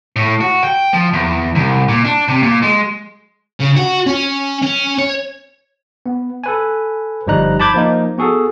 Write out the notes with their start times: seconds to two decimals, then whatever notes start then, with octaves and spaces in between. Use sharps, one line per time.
0.16 A2
0.41 F#4
0.64 G5
0.93 F3
1.13 E2
1.55 C2
1.89 A#2
2.04 D4
2.28 C3
2.43 A#2
2.63 G#3
3.60 C#3
3.76 F#4
4.06 C#4
4.62 C#4
4.99 C#5
6.06 B3
6.44 A4 B4 G#5
7.27 G1 F3 G3 D#4 A#5 F#6
7.60 A5 B5 D6 G6 G#6
7.74 F3 A#3 D#4
8.18 B3 F#4 G#4 A4